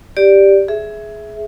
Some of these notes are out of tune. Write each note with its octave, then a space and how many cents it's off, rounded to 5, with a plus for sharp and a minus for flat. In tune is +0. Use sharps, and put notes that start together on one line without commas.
G4 +0 D5 +0
G#4 +15 E5 +0